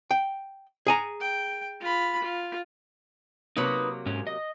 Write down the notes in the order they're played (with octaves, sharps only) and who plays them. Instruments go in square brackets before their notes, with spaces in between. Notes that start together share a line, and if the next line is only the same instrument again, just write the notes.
[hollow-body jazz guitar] G5
G#4 G#5 A#5
[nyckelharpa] G5
F4 B5
F4
[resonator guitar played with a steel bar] C3 F#3 A#3 [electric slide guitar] D#4 B4
[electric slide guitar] G#2 C#4
D#5